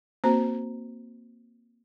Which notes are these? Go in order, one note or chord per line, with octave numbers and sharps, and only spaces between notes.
A#3 C4 F#4 C5 A#5